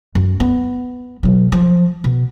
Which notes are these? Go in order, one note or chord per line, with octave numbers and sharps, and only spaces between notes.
F#2
B3
B2 F#3
F3
B2